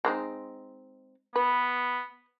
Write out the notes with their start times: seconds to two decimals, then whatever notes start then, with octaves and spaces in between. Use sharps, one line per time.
0.05 G#3 C4 D#4
1.36 B3 B4